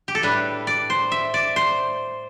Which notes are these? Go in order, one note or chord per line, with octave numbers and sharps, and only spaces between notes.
G4
A4
A2 G3 D4 B4
D5
C5
E5
D5
C5